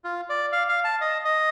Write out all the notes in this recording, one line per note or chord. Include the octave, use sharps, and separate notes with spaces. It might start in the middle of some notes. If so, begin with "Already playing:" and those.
F4
D5
F5
F5
A5
D#5
D#5